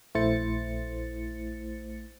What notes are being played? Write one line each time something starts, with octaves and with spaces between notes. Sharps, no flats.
A#1 A3 E4 C5 A6 C#7